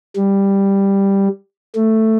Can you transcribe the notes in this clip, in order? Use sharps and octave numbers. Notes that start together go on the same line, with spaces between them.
G3
A3